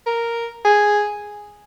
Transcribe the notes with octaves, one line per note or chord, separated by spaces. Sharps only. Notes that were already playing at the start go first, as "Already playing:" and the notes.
A#4
G#4